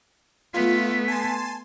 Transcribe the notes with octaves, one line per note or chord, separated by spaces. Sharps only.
A3 B3 F4
G#5 A5 C6